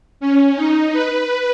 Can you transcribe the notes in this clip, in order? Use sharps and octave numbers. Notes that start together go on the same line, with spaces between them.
C#4
D#4
B4